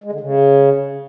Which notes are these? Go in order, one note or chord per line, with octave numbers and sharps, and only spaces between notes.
G#3
D3
C#3